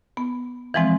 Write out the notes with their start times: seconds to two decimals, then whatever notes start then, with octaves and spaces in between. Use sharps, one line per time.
0.17 B3
0.74 E3 F3 G#3 C4